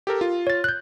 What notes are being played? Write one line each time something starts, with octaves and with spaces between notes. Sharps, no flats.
G4 A4 A#4
F4
C#5 A6
F#6 G6